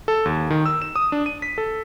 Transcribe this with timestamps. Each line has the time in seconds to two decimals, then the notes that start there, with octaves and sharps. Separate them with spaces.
0.08 A4
0.25 D#2
0.50 D#3
0.66 E6
0.82 E7
0.96 D#6
1.12 D4
1.26 D#7
1.42 B6
1.58 A4